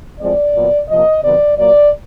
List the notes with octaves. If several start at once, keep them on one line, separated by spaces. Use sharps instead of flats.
A2 F3 G#3 C4 D5
A#2 F#3 B3
C3 F3 A#3 D#5
C3 D#3 F#3 B3 D5
A#2 F#3 A#3 D5